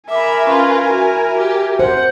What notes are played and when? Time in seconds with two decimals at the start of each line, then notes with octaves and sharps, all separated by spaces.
0.10 A#4 E5 G#5 B5 D6
0.47 C#4 F4 B4
0.86 E4 F#4 E5
1.37 G4
1.79 C5 F#5